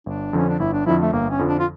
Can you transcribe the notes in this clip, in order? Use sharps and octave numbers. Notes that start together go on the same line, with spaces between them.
G1 D4
F2 D3 F3 C#4
D4
G1 E4
D4
F2 D3 F3 E4
A3
G1 A#3
C#4
F2 D3 F3
D4
F4